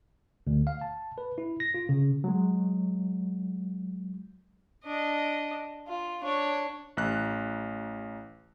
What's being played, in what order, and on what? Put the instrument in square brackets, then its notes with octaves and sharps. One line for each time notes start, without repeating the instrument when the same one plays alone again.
[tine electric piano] D2
F5
A5
B4
E4
A#6
F4
C#3
[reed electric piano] F#3 G#3
[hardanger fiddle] D4 D#5
F4
D4 C#5
[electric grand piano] A1 F#6